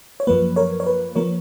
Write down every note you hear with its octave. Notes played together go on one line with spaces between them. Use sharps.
C#5
F#2 F3 A#3 B4
A#4 C#5
C#5
B4
F3 A#3 A#4 C#5